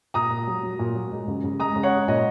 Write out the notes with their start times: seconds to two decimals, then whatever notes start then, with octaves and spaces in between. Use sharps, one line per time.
0.14 A#2 A#5 D#6
0.30 A#2
0.47 F#3
0.63 F#3
0.79 A#2
0.95 F#3
1.11 G#3
1.27 C#3
1.44 C#3
1.60 G#3 A#5 D#6
1.76 C#3
1.83 C#5 F#5
1.91 G#3
2.08 A#2 D#5